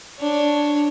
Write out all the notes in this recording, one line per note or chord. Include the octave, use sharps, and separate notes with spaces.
D4 C#5